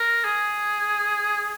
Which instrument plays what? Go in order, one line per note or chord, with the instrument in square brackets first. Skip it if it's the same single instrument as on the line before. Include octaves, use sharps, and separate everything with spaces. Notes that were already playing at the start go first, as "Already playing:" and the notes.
Already playing: [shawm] A#4
G#4